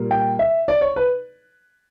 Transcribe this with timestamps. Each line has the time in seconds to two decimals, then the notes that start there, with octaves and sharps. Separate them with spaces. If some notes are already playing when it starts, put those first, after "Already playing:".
Already playing: A#2 G3 A#3
0.11 G5
0.39 E5
0.68 D5
0.81 C#5
0.96 B4